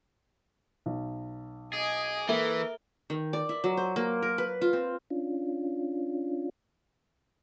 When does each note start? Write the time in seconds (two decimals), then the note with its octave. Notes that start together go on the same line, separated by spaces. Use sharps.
0.86 B1
1.73 G#4 D#5 G#5 D6
2.29 E3 A#3 A4 A#4 E5 G7
3.10 D#3
3.33 D5
3.49 E4
3.64 F#3
3.77 C5
3.96 A#3
4.22 A#4
4.38 B4
4.61 F4
4.73 C4
5.10 C#4 D4 F4